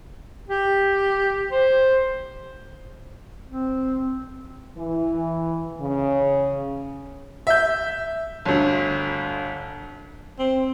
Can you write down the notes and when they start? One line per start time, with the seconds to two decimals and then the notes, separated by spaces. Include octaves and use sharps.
0.49 G4
1.52 C5
3.48 C4
4.77 E3
5.80 C#3
7.47 E5 G6
8.45 G1 D2
10.39 C4